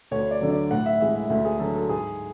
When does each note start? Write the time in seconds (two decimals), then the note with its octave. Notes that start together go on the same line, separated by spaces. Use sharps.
0.11 D2 C#5
0.31 D5
0.41 D3 F#3
0.51 D5
0.71 A2 F#5
0.86 E5
1.00 E3 G#3 E5
1.15 E5
1.30 D2 E5
1.45 G#4
1.60 D3 F#3 A4
1.75 A4
1.89 G#2 G#4